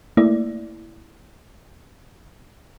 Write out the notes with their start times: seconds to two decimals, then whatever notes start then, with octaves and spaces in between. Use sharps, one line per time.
0.17 A3 A#3 E4 D5